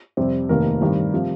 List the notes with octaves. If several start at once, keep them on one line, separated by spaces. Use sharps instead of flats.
F2 C3 G3 C4
F1 D#2 D#3 A#3 A#4
G2 D#3 G3 C4
C3 F3